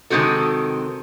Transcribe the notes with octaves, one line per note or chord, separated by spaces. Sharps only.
C3 D#3 G#3 C4 F#4 A4